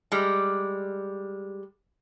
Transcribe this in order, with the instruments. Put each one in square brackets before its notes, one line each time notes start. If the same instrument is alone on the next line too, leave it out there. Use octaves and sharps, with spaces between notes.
[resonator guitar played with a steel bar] G3 G#3